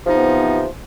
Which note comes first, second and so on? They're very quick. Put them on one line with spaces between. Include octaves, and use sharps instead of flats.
F3 C3 D#4 B3 E3